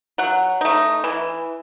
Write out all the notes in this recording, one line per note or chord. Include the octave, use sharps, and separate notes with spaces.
F#3 F#5
A3 D#4
E3